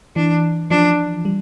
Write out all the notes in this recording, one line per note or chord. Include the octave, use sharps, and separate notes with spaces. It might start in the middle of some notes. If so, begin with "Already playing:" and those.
E3 D4
F3 D4
G3